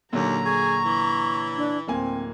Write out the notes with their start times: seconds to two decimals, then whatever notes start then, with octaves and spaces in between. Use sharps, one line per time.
0.12 D#2 A#2 D3 F#3 A#5
0.45 G#4 C#6
0.85 E3
1.57 D4
1.88 D1 A#3 C4 G#5